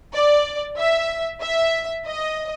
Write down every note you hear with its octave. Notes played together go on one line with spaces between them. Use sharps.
D5
E5
E5
D#5